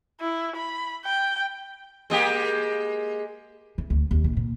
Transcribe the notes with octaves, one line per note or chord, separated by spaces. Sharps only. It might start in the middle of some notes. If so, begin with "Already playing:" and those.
E4
B5
G5
G#3 A#3 G4
E3
D2
D#2
A#1
A#2